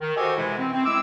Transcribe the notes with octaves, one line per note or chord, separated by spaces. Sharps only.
D#3
F#4 G4 A4 C5 D#5 G#5
C3 E3 G#3 E4
C4
C4
G#3 E4 D6 E6